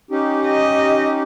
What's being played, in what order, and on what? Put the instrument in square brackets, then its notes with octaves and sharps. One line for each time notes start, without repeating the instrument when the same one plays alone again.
[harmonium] C#4 D#4 G4
[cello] D#5